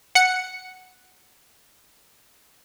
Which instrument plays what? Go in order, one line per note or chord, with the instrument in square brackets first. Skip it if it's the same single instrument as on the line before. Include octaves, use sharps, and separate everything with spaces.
[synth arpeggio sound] F#5 C#7